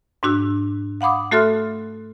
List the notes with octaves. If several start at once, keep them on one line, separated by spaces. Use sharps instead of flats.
G#2 D4 F#4 E6
F5 F#5 B5 D6 D#6
A3 F#4 A4 E5 C6 F6